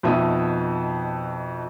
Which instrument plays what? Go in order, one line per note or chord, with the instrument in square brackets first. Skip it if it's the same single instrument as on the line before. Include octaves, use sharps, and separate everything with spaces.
[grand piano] F2 B2 D#4 E5 A5 D#6